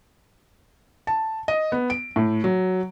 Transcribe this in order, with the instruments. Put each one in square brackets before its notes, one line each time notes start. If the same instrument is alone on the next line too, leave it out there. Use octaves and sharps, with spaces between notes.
[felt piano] A5
D#5
B3
D7
A2
F#3